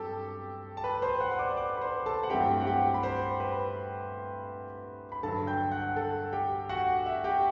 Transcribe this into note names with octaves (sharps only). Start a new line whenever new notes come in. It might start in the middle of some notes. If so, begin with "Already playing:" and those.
Already playing: G2 F#3 C4 G4 A4 G5 A5
A5
B4 B5
C5 C6
F#5 F#6
C6
D5 D6
D5 D6
B5
C5 C6
A4 A5
F#5
G2 F#3 A3 C4 E4 G4 G5
F#5
G4 G5
B5
C5 C6
B4 B5
B5
G2 D3 F#3 A4 A5
G5 G6
F#5 F#6
A4 A5
G4 G5
F#4 F#5
E5
G4 G5